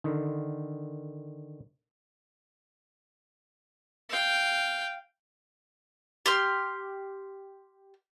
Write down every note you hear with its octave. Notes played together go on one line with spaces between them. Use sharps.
D3 D#3
F5 G5
G4 C6 F6